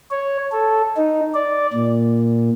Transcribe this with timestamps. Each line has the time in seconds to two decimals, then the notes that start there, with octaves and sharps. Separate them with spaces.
0.11 C#5
0.52 A4
0.97 D#4
1.35 D5
1.73 A#2